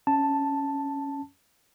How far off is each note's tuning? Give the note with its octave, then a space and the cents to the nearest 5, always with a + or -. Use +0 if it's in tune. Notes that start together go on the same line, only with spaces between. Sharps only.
C#4 +0 A5 +0